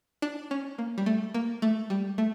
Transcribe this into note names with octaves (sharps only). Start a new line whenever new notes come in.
D4
C#4
A#3
G3
A3
A#3
A3
G3
A3